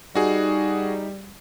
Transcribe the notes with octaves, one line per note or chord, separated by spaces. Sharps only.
G3 D#4 F#4 G#4